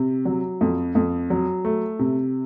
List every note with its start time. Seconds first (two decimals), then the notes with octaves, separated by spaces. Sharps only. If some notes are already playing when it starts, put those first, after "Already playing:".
Already playing: C3
0.25 F#3
0.61 F2
0.95 F2
1.30 F#3
1.65 A3
1.99 C3